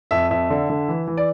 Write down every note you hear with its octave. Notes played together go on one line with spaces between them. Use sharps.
F2 E5
F2 E5
D3
D3
E3
E3
D5